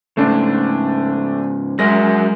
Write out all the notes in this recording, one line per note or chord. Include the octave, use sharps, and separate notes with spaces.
G#2 C#3 A3 D4
F#3 G#3 A#4 E5 A#6